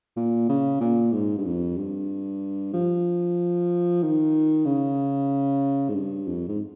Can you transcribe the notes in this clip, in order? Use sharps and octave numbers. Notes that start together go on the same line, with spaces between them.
A#2
C#3
A#2
G#2
G2
F2
G2
F3
D#3
C#3
G#2
G2
F2
G#2